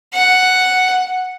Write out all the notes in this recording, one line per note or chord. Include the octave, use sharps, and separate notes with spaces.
F#5